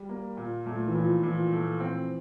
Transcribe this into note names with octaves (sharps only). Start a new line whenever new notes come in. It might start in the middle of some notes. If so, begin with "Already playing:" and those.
Already playing: G3
A#3
A#2
A#2 A3
E3
A#2 F3
A#2 E3
A3
C4